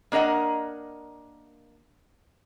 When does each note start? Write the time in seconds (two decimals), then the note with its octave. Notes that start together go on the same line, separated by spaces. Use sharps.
0.12 A#3 D4 A#4 D#5 F#5